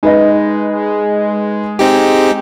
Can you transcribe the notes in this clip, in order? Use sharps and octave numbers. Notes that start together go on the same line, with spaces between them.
G#3 D#4 B4 D#5
C4 D#4 G4